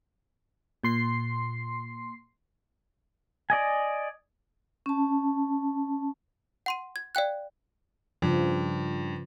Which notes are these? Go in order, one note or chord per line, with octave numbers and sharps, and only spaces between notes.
A#2 C6 C7
D5 D#5 G#5
C#4 A5
F#5 C6 D#7
G#6
D5 F5 G5 F#6
G2 C#3 F3